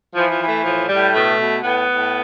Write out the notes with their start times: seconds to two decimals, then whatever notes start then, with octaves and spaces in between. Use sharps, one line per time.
0.15 E3 F3
0.31 F3
0.39 E3
0.48 A3
0.64 A2 F3
0.89 A2 G3
1.14 B2 A3
1.38 B2
1.63 A2 B3
1.88 A2